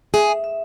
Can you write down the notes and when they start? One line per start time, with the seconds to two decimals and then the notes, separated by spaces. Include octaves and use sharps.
0.14 G#4 E5
0.28 E5
0.44 E5